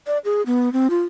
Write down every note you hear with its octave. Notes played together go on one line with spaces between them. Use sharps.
D5
G#4
B3
C4
F4